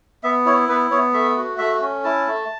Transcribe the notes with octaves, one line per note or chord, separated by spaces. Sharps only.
B3 E5
E4 C#5
B3 B4
B3 C#5
A3 E5
F#4
A3 E5
C#4
E4 A5
A3